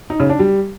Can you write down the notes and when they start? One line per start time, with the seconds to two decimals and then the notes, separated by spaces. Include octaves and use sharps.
0.10 D#4
0.20 C#3
0.29 D4
0.39 G3